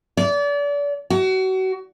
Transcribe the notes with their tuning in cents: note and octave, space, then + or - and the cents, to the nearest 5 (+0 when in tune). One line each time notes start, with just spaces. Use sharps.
D5 -35
F#4 +30